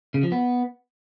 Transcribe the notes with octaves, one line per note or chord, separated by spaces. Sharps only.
C#3
F3
B3